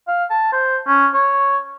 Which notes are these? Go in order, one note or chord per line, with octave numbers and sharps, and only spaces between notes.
F5
A5
C5
C#4
C#5